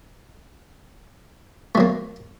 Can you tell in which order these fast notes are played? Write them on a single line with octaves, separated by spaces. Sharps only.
A3 F#3 A#3